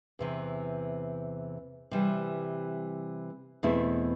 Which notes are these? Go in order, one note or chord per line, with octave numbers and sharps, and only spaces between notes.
E2 C3 E3
C3 E3 G3
E2 B2 A3 C4 E4